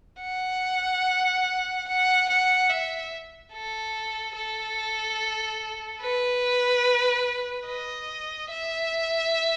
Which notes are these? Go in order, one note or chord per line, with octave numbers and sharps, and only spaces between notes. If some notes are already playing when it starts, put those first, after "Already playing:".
F#5
F#5
F#5
E5
A4
A4
B4
D#5
E5